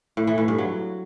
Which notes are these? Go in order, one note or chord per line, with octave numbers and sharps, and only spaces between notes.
A2
E3
A2
G2
F#3